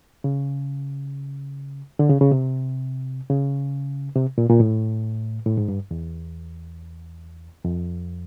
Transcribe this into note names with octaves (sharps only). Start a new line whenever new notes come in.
C#3
D3
C#3
C#3
C3
C#3
C3
A#2
A#2
A2
A2
G#2
G2
E2
F2